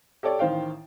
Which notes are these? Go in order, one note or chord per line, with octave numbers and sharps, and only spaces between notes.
G4 A4 C#5 D5
A1 D#3 C5 F5 G5